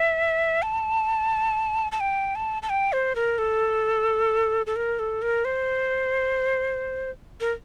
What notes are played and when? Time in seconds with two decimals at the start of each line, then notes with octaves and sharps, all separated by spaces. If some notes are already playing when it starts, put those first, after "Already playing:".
Already playing: E5
0.62 A5
1.92 A5
2.00 G5
2.35 A5
2.63 A5
2.69 G5
2.93 C5
3.15 A#4
3.38 A4
4.66 A4
4.76 A#4
4.99 A4
5.22 A#4
5.45 C5
7.41 A#4